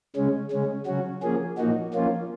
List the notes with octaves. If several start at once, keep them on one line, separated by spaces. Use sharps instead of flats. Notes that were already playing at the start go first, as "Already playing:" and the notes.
C#3 G#3 C#4
C#3 G#3 C#4
C#3 F#3 C#4 F#4
F3 A#3 C#4 G#4
A#2 F3 A#3 D#4 F#4
F3 A#3 C#4 F4